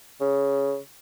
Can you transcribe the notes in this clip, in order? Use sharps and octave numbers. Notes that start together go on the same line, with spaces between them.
C#3